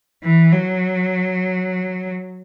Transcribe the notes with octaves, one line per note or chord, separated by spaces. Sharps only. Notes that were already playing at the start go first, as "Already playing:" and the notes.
E3
F#3